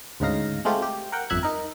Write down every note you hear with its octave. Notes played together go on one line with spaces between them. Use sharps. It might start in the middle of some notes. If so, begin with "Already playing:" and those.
D2 G#2 C#3 D#4 F5 A#6
G#3 A3 C4 F4 G4
G4
A#4 F#5 G5
G1 F2 E5 F#6 G#6
D#4 A#4